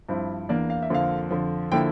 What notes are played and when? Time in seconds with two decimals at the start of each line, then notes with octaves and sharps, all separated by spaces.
0.09 G2 F3 C4 E4
0.49 E2 E3 A#3 D4 D5
0.70 F5
0.83 E5
0.90 F2 D3 F3 A#3 F5
1.31 F2 D3 F3
1.72 D3 F3 A#3 E4 G5